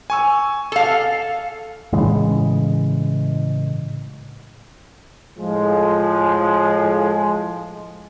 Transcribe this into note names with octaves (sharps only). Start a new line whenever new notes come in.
G#5 C#6 E6
A4 F5
A2 C#3 E3 G#3
A2 F3 G#3